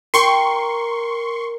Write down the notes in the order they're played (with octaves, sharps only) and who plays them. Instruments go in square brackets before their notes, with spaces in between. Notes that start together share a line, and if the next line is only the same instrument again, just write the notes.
[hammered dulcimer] A#4 G5 [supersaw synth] C6 C#6